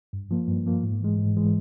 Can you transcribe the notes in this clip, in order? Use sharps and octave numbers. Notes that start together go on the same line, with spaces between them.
G2
F3 A#3
G2
F3 A#3
G#2
E3 G#3
G#2
E3 G#3